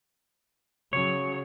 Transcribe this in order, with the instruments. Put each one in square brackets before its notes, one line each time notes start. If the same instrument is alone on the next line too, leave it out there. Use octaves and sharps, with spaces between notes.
[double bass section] C#3 F#3 [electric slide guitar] C#5